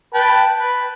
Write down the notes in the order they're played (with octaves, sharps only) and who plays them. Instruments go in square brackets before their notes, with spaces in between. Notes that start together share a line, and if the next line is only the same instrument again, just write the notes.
[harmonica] B4 G5 A5
B4